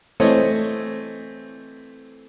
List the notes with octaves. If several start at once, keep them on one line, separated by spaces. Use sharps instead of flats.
E3 A3 C4 C#5 D#5